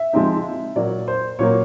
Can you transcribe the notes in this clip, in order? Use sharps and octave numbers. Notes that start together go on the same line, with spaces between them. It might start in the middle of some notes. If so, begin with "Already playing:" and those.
Already playing: E5
F3 G#3 C4 D#4
A#2 F#3 A#3 D5
C5
A#2 F#3 A#3 C#5